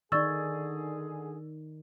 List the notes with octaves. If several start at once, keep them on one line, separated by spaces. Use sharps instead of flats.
D3 D#3 D#4 G#4 D5 C#6 E6 A6